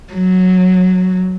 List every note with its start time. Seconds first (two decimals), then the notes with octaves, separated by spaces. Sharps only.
0.13 F#3